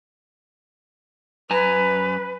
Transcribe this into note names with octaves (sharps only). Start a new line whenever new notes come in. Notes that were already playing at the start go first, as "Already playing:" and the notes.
F#2 B4 G#5 A#5